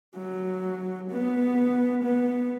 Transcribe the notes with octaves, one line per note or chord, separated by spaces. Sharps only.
F#3
B3
B3